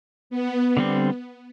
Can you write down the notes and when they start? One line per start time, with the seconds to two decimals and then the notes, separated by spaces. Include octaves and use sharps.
0.30 B3
0.77 D3 G3 C4